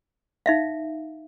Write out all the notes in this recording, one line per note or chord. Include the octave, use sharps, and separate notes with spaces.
D#4 E5 F5